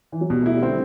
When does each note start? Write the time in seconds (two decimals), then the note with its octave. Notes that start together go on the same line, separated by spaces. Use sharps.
0.12 E3
0.21 F#3
0.30 B2 G3
0.42 A3
0.46 E4
0.54 G3
0.63 D3 C4